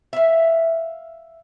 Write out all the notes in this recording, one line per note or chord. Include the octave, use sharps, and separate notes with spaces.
E5 F5